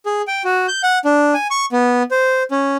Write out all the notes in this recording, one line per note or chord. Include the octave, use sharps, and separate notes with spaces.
G#4
G5
F#4
G6
F#5
D4
G#5
C#6
B3
C5
C#4